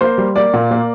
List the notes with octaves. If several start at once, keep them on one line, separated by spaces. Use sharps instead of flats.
A#3 C5
G3
A#3 D5
A#2
A#3